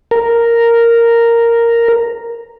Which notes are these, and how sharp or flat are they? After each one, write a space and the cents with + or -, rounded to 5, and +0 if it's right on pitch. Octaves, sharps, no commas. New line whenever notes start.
A#4 -5